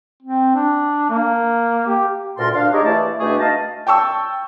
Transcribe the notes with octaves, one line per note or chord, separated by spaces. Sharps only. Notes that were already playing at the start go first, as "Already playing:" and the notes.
C4
D4
A#3
G4
D2 A#2 A#4 A5 C6
D4 F5
D#4 G4 G#4 A#4 C#5 D#5
E3 A3 E4 D5 A5
B2 A3 D4 G4 G#4 C#6
D#4 D#5 F5 A5
G5 A5 C#6 E6